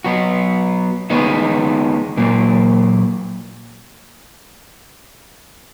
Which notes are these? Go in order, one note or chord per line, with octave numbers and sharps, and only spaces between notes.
F#3 B3 F#4
D#3 G#3 B3 D#4
A#2 F#3 A#3